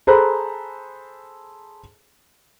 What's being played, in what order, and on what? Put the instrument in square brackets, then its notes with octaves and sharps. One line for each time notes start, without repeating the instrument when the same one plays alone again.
[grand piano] G#4 A4 C5 A#5 B5 F#6